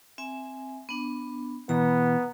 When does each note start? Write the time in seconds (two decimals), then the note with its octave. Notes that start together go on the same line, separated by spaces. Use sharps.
0.18 C4 E5 G#5
0.89 B3 D4
1.69 B2 E3 B3 A#5